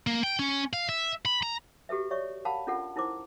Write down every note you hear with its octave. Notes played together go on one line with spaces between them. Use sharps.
A#3
G5
C#4
F5
E5
B5
A#5
F#4 G4 A4 B4 E5
C#5 D5 E5 C#6
A#4 F5 F#5 A5 B5
C#4 D4 F4 A4 A#4 F#5
D#4 E4 A#4 C5 D6